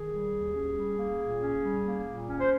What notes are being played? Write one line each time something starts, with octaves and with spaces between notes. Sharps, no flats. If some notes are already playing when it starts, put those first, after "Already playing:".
Already playing: D#3 G#4
G3
D#2
C#4
G3
A#3
A#2
C#4
G3
A#3
A#2
C#4
C5